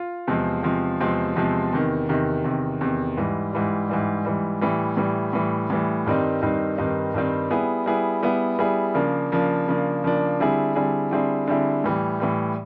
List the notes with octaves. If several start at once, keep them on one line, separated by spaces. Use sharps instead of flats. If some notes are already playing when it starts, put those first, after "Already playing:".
Already playing: F4
E2 C3 F3 G#3 C4
E2 C3 F3 G#3 C4
E2 C3 F3 G#3 C4
E2 C3 F3 G#3 C4
E2 C3 D#3
E2 C3 D#3
E2 C3 D#3
E2 C3 D#3
G#2 E3 G3
G#2 E3 G3
G#2 E3 G3
G#2 E3 G3
A2 E3 G3
A2 E3 G3
A2 E3 G3
A2 E3 G3
G2 D#3 G3 C4 D#4
G2 D#3 G3 C4 D#4
G2 D#3 G3 C4 D#4
G2 D#3 G3 C4 D#4
G3 B3 E4 G#4
G3 B3 E4 G#4
G3 B3 E4 G#4
G3 B3 E4 G#4
C#3 F3 A#3 D4
C#3 F3 A#3 D4
C#3 F3 A#3 D4
C#3 F3 A#3 D4
D3 G3 C4 E4 G#4
D3 G3 C4 E4 G#4
D3 G3 C4 E4 G#4
D3 G3 C4 E4 G#4
A2 E3 G3
A2 E3 G3